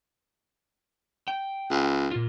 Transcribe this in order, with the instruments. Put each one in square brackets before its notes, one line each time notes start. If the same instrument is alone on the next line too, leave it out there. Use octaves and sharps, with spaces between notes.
[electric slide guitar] G5
[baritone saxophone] C#2
[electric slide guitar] A#2 F4